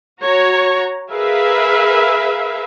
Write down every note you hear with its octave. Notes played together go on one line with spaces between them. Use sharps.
F#4 C#5 A#5
G#4 A#4 B4 E5 F5